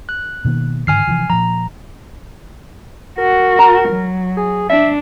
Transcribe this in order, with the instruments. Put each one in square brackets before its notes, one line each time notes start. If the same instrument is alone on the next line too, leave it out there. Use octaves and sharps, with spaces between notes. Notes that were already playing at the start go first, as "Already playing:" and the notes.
[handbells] F#6
[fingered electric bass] B2 D#3 A#3
[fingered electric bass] G#2 D3 D#3 [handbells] G#5 F6 C7
[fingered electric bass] C3 E3 F3
[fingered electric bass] A#2 F3 [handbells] A#5
[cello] F#4 [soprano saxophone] A#4
[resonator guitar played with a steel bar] A#5
[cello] F#3
[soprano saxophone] G#4
[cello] D4 [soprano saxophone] E5